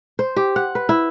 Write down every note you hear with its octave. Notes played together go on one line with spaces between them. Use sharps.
C5
G4
F#5
B4
E4